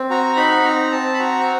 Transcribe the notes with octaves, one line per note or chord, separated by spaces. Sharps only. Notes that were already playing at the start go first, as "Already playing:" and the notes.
Already playing: C4
F#4 A#5
D#4 B5
C4 A#5
C4 A5
B5
F#4 A#5